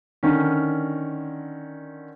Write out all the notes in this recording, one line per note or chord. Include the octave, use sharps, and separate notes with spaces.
D3 D#3 C#4